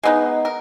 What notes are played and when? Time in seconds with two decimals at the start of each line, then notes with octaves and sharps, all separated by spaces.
0.03 G#3 B3 D#4
0.45 A#4